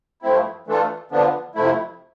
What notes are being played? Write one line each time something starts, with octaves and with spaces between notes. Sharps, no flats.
G2 F3 A3 C4 E4
E3 A3 D4 F4 A4
F2 D3 F3 B3 D4
F2 C3 F3 A3 E4